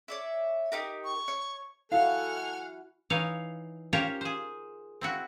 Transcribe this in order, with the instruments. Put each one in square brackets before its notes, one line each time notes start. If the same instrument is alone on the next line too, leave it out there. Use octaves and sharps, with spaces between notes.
[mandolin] C#5 D5 E5
D#4 G4 A#4
[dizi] C#6
[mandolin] C#5
[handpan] E4 F#4 [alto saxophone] A4 [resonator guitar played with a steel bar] F5 [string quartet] F#5 G#5 F6
[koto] E3 D#4 C#5 F5
C#4 F4 G4 A#4 C5 C#5
G#4 C5
C4 E4 F#4